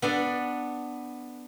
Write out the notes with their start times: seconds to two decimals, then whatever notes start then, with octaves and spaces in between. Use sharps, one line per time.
0.02 B3 D4 A4